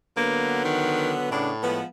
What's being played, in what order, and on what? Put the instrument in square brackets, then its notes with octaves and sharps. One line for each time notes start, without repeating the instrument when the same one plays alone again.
[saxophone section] D3 F#3 B3 [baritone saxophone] A#3
[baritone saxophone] D#3
[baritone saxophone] A2 [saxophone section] C#3 B3 D4
[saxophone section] F3 G#3 B3